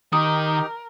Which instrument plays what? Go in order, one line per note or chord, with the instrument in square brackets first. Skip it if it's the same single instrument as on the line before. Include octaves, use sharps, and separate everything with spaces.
[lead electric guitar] D#3 [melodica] D#4 G4 [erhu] A#4 [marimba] D#6